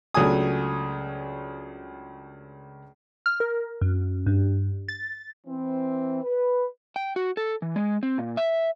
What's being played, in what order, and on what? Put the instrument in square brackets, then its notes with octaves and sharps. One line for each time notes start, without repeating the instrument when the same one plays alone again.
[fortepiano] C#2 F#3 A3 D4 G#5 D#6
[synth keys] F6
A#4
F#2
G2
A6
[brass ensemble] E3 C4
B4
[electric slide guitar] G5
F#4
A4
E3
G#3
C4
A#2
E5